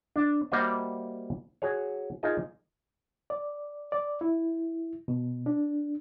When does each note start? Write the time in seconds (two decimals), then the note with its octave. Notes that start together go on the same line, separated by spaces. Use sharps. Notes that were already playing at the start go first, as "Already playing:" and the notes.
0.16 D4
0.52 G3 A#3 F#4 C5 D#5 E5
1.62 F#4 G#4 C#5
2.23 D#4 F4 G#4 A#4 D#5
3.30 D5
3.92 D5
4.21 E4
5.08 B2
5.46 D4